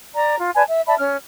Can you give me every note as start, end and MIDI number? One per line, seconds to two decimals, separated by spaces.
0.14 0.37 74
0.14 0.37 82
0.38 0.51 65
0.55 0.63 71
0.55 0.63 74
0.55 0.63 80
0.55 0.63 81
0.68 0.81 76
0.87 0.95 74
0.87 0.95 76
0.87 0.95 81
0.87 0.95 83
0.99 1.16 61
0.99 1.16 89